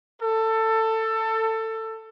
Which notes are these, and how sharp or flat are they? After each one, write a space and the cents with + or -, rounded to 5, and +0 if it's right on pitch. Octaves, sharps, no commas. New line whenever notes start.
A4 +20